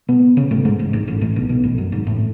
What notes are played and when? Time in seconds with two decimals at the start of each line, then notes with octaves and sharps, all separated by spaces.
0.08 B2 B3
0.37 C#3 C#4
0.51 A2 A3
0.65 G#2 G#3
0.79 A1 A2
0.93 G#1 G#2
1.07 A1 A2
1.21 A1 A2
1.36 B1 B2
1.49 B1 B2
1.64 A1 A2
1.78 F#2
1.92 G#1 G#2
2.07 A1 A2